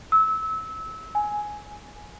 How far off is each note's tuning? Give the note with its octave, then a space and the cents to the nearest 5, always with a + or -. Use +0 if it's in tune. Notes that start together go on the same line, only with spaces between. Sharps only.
E6 -25
G#5 +5